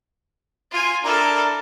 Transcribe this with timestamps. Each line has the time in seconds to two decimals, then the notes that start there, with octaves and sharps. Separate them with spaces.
0.71 F4 G#5
1.05 D4 E4 A4 A#4 A#5